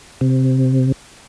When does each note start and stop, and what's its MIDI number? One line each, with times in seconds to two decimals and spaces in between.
0.21 0.92 48